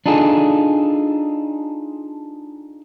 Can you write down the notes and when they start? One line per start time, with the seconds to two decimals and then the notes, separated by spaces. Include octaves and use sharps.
0.06 D4 D#4 F4 G#4 A4